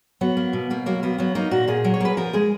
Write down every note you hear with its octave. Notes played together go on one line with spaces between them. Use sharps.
F#3 B3
A#3
B2
B2 A#3
F#3 A#3
A#3 B3
F#3 B3
A#3 D#4
A#2 F#4
A#2 G#4
F#3
C#5
A#3 B4
F3 A#4
G#3 G#4